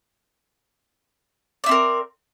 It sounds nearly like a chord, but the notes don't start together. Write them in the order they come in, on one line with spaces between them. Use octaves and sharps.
D5 E4 C4 A#4